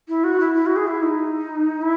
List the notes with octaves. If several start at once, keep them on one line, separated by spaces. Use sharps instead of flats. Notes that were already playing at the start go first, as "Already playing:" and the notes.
E4
F#4
E4
E4
F#4
G#4
E4
D#4
E4